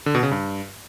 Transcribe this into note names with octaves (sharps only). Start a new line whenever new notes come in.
D3
B2
C#3
G2